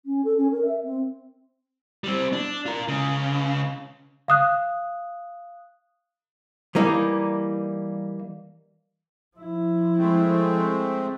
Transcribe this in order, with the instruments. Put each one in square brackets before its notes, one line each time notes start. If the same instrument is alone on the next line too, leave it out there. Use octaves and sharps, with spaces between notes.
[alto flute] C#4
A4
C#4
A#4
E5
C4
[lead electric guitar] G3 C4
D4
F4 A#4
C#2 C#3
[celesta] F5 D#6 F#6
[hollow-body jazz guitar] E3 G3 A#3 D#4
[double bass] F3 E4
[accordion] G#3 A3 C4